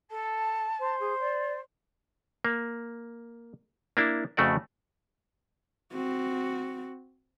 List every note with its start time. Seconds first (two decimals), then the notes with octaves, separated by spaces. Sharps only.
0.11 A4 A5
0.79 C5
1.00 G#4
1.20 D5
2.45 A#3
3.97 A#3 D4 E4
4.37 F2 C#3 A3 F#4 D5
5.93 C4 F#4